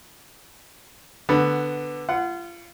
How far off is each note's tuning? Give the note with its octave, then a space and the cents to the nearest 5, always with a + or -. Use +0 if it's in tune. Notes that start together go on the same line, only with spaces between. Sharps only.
D3 +5 B3 +5
F4 -30 F#5 +0